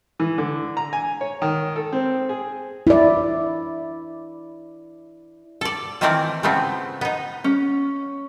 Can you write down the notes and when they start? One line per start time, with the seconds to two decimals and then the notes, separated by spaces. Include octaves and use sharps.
0.20 E3
0.38 D3
0.77 A#5
0.93 G#5
1.21 C#5
1.42 D#3
1.76 A4
1.93 C4
2.29 G#4
2.87 E4 D5
5.61 A4 D5
6.01 D#3 E3 A3 C4 A#4 D5
6.43 C#3 F3 A3 B3 C4
7.01 B3 D#4
7.44 C#4